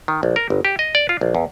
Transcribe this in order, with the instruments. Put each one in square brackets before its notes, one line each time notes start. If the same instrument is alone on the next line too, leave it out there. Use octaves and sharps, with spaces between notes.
[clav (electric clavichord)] D#3
A#1
A#4
G1
G4
D#5
D5
F4
A#1
E2